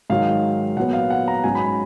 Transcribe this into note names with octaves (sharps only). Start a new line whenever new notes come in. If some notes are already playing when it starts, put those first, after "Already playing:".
G#2 D#3 F#3 F5
A#2 F#3 B3 F#5
F5
F#5
A#5
G#2 F#3 C#4 G#5
B5
B5